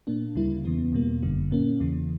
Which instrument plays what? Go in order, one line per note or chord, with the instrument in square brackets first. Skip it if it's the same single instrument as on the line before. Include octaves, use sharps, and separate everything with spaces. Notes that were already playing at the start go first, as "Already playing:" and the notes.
[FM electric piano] A#2 A#3 D4
D2 C#3 G3 A#3 E4
E2 C#3 E3 B3
E2 B2 G3 A#3
G1 F#2 D3 G3
A#2 A#3 C#4
E2 C#3 E3